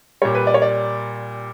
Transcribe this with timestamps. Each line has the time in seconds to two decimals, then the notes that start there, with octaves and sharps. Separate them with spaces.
0.22 A#2 G3 C#5
0.35 B4
0.47 D5
0.54 C#5
0.62 D5